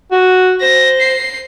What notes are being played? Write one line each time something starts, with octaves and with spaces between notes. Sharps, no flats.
F#4
C5 A#6
C7